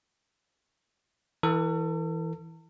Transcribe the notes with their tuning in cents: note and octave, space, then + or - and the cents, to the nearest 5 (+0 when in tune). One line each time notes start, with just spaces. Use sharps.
E3 -10 A4 +35